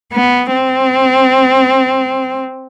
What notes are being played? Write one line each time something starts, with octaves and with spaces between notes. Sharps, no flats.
B3
C4